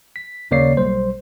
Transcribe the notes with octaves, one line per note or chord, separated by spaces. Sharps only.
B6
D#2 C#3 A#3 C#5 D5 C7
B1 G3 C5